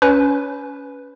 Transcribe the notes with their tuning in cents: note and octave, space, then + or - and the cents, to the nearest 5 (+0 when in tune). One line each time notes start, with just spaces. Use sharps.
C#4 +20 B4 +0